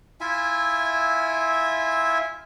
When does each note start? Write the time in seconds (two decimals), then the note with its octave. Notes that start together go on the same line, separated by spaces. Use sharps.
0.21 E4 F4 E5 G#5